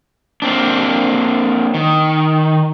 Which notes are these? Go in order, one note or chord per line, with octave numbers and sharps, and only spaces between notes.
A#3 C4 D4
D#3